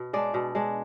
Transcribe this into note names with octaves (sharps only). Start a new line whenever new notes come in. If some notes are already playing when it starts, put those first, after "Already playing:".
Already playing: B2
G#3 D4 D5
B2
G#3 D4